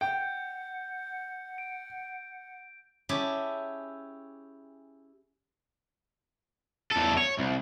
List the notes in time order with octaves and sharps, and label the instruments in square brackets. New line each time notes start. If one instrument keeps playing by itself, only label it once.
[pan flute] F#5 [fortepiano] G5 [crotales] G6
[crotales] D7
[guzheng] C#4 E4 G4 G#4 A5
[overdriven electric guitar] E2 A4
C#5
C2